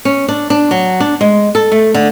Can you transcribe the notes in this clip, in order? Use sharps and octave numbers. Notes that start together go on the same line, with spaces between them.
C#4
D4
D4
F#3
D4
G#3
A4
A3
D3